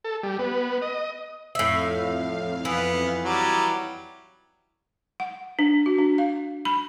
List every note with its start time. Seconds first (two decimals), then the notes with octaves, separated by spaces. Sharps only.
0.04 A4
0.23 G3
0.39 B3
0.82 D#5
1.55 F2 A2 E5 F5
2.65 E3 B3
3.25 F#3 G3
5.20 F#5
5.59 D4
5.86 F#4
5.98 D4
6.18 F5
6.65 B5